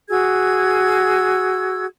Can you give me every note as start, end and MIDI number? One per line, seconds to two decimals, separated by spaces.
0.09 1.85 66
0.09 1.85 68
0.09 1.85 88
0.09 1.85 92